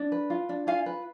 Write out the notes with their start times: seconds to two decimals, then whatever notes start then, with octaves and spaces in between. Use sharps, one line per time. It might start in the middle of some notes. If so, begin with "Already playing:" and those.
Already playing: D4
0.12 B4
0.30 F4
0.49 D4
0.67 F4 F5 G#5
0.86 B4